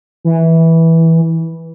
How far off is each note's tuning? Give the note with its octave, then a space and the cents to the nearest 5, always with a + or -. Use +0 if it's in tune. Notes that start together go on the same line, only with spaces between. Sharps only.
E3 -10